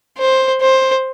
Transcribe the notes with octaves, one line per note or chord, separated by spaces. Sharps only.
C5
C5